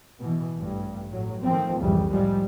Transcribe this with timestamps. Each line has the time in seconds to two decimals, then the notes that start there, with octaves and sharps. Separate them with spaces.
0.19 B2 E3
0.57 A1 G2
1.10 A2 F#3
1.43 D#3 F3 A3 C4
1.79 C2 F2 G#2 C#3 E3 G3
2.10 A2 F3 G3 G#3